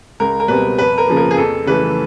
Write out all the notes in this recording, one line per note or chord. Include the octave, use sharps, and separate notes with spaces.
C#2 A#4
A#4
B2 G3 C4 B4
F2 B4
A#4
C#3 F3 A#3
A#4
G#4
F2 A4
C#3 E3 A3 B4